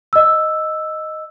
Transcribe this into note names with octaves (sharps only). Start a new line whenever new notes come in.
D#5 E6